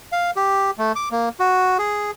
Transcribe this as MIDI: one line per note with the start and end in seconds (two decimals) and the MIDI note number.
0.12 0.31 77
0.36 0.71 67
0.78 0.92 57
0.96 1.09 86
1.11 1.29 58
1.40 1.78 66
1.79 2.11 68